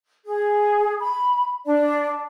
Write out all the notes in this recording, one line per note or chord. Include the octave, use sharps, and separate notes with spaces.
G#4
B5
D4 D5